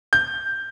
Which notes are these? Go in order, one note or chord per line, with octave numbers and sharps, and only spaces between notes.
G6